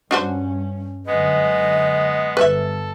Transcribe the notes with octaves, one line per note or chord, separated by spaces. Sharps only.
G2 C#4 D4 F#4 C5
F#2 D3 G#3 B3 D#5
G1 A4 B4 E5